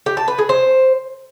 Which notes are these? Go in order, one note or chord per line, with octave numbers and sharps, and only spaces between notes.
G4
A5
B4
G#4
C5